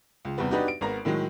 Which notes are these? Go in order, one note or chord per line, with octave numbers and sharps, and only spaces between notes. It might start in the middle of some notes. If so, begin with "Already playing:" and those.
C#2
E2 C3 G3 B3
B3 D4 D#4 F#4 G4 B4
D7
G#1 B3 A#4 A#5
A2 D#3 F#3 G#3